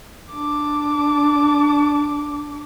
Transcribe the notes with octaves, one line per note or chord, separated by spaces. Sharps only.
D4 D6